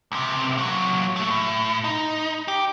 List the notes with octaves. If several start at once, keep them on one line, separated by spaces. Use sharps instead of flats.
C#2 C3
A#2 F#3
F#3 A3
A2
D#4
G4